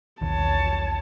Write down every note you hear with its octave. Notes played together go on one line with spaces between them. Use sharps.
B1 E2 D#3 C#5 A5